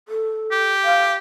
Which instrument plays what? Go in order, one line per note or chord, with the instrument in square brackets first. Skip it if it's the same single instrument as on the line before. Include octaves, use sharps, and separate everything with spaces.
[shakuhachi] A4
[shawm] G4
[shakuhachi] F5